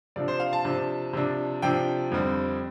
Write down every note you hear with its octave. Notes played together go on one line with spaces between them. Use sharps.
C3 F3 D4 D5
C5
F5
A5
C3 F3 D4
C3 F3 D4
C3 F3 D4 G5
F2 D3 G3 C4